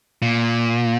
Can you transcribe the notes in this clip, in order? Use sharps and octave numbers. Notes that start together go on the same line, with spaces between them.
A#2